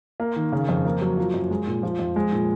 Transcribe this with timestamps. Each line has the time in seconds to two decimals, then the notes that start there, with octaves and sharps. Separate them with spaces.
0.20 A#3
0.36 D#3
0.52 C#3
0.69 F2
0.85 A#3
1.02 F#3
1.17 F3
1.34 F#2
1.51 G#3
1.67 A#2
1.83 F3
1.99 F2
2.16 G#3
2.32 A#2